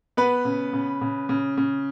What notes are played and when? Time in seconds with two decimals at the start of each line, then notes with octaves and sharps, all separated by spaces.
0.17 B3 B4
0.45 C#3
0.73 C#3
1.01 C#3
1.29 C#3
1.58 C#3